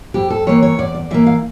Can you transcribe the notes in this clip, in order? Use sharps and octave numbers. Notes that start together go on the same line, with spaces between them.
F2 G4
A4
E3 A#3 C#5
C#5
E2 D5
D5
E3 A#3 E5
F5